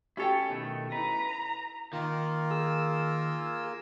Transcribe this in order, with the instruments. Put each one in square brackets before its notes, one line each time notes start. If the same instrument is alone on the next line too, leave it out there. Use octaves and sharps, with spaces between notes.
[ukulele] C#4 A4 G5 [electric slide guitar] E4 C#5 [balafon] F#4 G4 G#5
[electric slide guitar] B2 D#3 A3
[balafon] E4 D#5 [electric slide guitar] B4 [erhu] A#5
[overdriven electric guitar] D#3 [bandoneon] A#3 F4 A#4
[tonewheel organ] G#4 E6